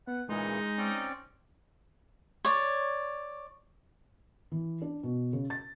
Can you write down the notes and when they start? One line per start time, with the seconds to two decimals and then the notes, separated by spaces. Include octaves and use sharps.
0.07 B3 F#5
0.29 A#2 C#3 E3 G#3 D#4
0.78 C4 C#4 D5
2.45 C#5 D5
4.52 E3
4.82 D4
5.03 B2
5.33 C#3
5.50 A6